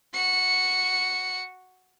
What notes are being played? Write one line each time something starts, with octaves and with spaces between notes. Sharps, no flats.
F#4 C#7